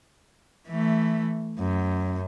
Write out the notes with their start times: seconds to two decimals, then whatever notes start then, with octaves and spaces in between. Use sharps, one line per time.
0.67 E3 A3
1.59 F#2